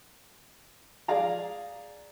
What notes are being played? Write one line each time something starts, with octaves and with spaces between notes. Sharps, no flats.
G#4 D5 F5 A#5